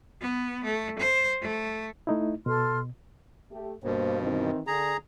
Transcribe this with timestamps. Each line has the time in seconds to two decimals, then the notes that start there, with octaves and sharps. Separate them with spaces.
0.21 B3
0.64 A3
0.99 C5
1.41 A3
2.07 A3 D#4 E4
2.46 B2 A4 C6 F6
3.51 A3 G4
3.84 G2 B2 A#3 C5
4.20 D#3 E3 C4
4.67 D3 G#4 A#5